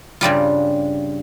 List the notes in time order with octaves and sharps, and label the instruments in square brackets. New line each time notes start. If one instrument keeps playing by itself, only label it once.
[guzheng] G2 C#3 G3 F4